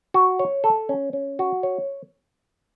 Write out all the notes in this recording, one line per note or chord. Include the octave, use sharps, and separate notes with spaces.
F#4
C#5
A4
C#4
C#4
F#4
C#5